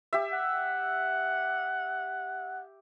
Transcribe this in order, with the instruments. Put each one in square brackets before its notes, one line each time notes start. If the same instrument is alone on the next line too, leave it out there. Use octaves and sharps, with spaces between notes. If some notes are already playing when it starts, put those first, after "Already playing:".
[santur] G4 E5
[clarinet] F#5